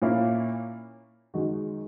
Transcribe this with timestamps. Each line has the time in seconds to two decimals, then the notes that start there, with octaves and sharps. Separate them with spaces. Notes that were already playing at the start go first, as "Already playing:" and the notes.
0.02 A#2 A#3 C#4 E4
1.34 F#2 D#3 G#3 D#4 F#4